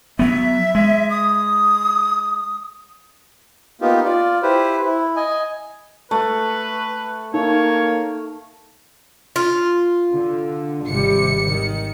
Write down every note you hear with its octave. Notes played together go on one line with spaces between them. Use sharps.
F#3 B3 E5
G#3
D#6
A#3 B3 D#4 F4 G4
F4 D5
E4 G4 B4 C5
E4
D#5 G#5
A3 B4
A#3 D#4 C#5
F4
D3
G#1 C3 G3 C#7
D#3